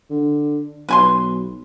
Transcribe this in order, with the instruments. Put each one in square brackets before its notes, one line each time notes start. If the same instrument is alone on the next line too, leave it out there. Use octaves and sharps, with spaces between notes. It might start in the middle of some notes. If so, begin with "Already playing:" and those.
[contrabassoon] D3
[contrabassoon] B1 [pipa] B4 G#5 C6